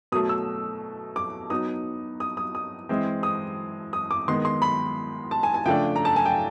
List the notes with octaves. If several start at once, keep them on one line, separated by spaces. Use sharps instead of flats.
B2 F#3 A3 D#6
E6
D6
F#3 B3 D#4 D#6
D#6
D#6
D#6
E3 G#3 C4 E4
D#6
D#6
D6
D#3 G#3 B3 C6
C6
B5
A5
G#5
G#5
C#3 F3 A3 D4 G5
A#5
A5
G#5
G5